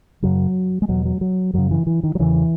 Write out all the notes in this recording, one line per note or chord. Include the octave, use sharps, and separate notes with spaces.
F#2 C#3 F#3
G#3
E2 B2 F#3
F#3
F#3
F#2 C#3 F#3
E3
E3
D#3
F#3
E2 C#3 E3